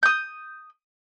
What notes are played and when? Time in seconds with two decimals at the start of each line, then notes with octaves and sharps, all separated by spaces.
0.03 D#6 G6